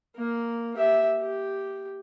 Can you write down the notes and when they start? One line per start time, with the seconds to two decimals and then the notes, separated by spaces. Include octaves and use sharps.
0.16 A#3
0.77 G4 E5
1.20 G4